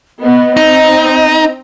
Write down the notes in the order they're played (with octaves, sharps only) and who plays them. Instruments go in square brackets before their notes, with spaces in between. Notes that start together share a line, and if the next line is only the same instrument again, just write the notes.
[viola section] B3 [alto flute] D#5
[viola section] C4 [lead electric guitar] D#4